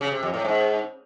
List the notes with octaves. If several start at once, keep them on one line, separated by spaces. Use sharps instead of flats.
C#3
C3
F2
A2
G#2